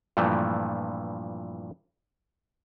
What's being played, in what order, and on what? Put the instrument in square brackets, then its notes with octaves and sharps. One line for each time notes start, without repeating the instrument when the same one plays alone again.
[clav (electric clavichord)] G2 A#2 E3 F3 A3